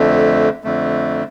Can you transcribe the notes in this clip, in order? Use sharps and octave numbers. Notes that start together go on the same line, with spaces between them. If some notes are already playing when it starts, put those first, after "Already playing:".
Already playing: F2 D3 A3
F2 D3 A3